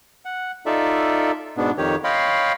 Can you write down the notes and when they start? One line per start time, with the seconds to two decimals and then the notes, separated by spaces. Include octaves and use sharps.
0.25 F#5
0.66 D#4 F4 A4 D5 E5
1.57 G#2 B2 B3 D4
1.78 F2 D#3 G4 C#5
2.04 C#5 D#5 F5 G5 B5 C6